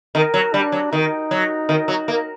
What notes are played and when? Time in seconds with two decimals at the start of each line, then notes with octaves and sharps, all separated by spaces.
0.15 D#3 A#4
0.34 F#3
0.53 G3 D4
0.72 F#3
0.92 D#3 D#4
1.31 F#3
1.69 D#3
1.88 F#3
2.08 A#3